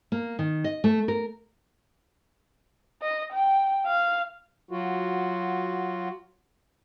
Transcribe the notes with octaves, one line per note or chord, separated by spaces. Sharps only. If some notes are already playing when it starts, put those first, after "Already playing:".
A#3
D#3
D#5
A3
A#4
D#5
G5
F5
F#3 F4 F#4